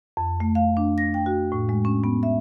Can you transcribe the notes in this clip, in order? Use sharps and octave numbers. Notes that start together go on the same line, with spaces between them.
F2
A3
F5
D4
A#6
G5
F#4
A2
G#3
C#4
B3
E5